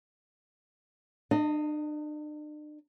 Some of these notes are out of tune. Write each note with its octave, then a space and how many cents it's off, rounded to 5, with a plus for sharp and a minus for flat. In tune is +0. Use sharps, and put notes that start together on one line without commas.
D4 +40 D#5 +0